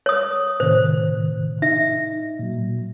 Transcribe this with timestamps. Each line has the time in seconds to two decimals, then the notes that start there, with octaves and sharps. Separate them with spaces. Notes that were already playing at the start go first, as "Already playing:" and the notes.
0.06 C#5 D#6
0.60 A2 C3 D#3 C5
1.62 D#4 E5
2.39 A#2 F#3